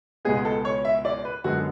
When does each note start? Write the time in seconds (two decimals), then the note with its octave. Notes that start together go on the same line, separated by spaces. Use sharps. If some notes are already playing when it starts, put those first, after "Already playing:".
0.25 C#2 B2 G#3 B3 G#4
0.45 A4
0.65 C#5
0.85 E5
1.05 D5
1.25 B4
1.44 F#2 D3 G#3 B3 F#4